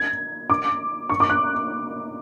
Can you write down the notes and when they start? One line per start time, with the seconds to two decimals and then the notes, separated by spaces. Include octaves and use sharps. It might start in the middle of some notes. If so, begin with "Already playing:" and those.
Already playing: G#6
0.50 D6
1.09 C#6
1.20 D6
1.30 F#6